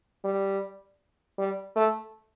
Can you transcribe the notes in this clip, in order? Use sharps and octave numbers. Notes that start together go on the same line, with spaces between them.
G3
G3
A3